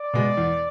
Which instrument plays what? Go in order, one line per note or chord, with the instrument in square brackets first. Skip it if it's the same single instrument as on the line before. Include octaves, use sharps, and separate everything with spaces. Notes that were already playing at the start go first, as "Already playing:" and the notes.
Already playing: [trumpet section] D5
[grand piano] B2 G#3
E2